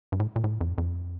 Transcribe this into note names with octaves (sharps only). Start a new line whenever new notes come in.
G2
A2
A#2
A2
F2
F2